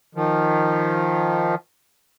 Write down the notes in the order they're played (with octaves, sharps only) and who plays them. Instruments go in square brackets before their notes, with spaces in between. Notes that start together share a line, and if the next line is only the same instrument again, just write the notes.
[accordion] D#3 F3